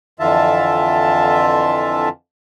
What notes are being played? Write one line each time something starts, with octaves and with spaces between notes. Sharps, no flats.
F2 D3 E3 F4 E5 A5